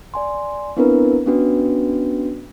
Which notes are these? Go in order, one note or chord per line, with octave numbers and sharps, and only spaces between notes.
D5 G#5 C6
B3 C4 D4 E4 A#4 B4
B3 C#4 D4 F#4 B4